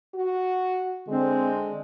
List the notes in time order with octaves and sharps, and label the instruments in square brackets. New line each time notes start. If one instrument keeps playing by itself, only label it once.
[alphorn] F#4
[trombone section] D3 D4 [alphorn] G#3 [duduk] C4